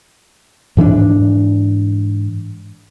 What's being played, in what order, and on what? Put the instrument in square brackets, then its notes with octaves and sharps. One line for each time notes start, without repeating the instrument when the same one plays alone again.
[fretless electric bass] G#2 E3 C4 D4